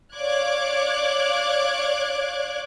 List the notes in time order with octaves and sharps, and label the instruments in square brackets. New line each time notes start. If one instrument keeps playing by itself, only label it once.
[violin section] C#5 D5 F5 D6 F#6 G#6